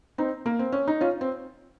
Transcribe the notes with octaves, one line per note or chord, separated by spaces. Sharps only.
C4 D#4
A#3
C4
C#4
D#4
C#4 F4
C4